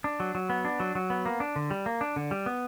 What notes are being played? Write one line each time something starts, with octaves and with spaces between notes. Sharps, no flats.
D4
F#3
F#3
B3
D4
F#3
F#3
B3
A#3
D4
D3
G3
A#3
D4
D3
G3
B3